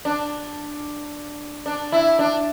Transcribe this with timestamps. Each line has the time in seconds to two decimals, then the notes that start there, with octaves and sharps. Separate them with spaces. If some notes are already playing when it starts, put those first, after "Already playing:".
0.05 D4
1.66 D4
1.92 E4
2.19 D4